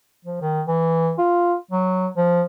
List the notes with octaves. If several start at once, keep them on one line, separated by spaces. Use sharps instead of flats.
F3
D#3
E3
F4
F#3
F3